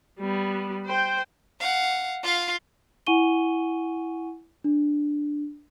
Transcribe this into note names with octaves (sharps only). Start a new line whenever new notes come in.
G3 B3
C5 G5
F5 F#5
F4 F5
E4 F#5 G#5 C#6 D#7 G7
D4